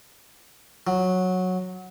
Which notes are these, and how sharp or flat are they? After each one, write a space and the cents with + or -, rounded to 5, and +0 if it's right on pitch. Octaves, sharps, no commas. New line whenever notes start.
F#3 -10